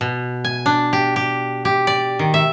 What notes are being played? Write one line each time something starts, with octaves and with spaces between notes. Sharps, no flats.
B2
G#5
D4
G4
G4
G4
D5
D#3
E5